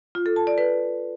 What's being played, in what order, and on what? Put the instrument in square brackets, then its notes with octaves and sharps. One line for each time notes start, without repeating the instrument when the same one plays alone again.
[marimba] F4
A4
A5
D5
B4